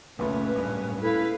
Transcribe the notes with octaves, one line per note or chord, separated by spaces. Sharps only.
F#1 C#2 A#2 A3 C#4 B4
D1 G2
E4 A4 B4 F5